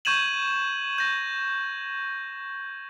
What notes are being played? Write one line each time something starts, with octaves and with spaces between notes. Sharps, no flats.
C#6 G6 G#6 D#7 E7 F#7
G6 A#6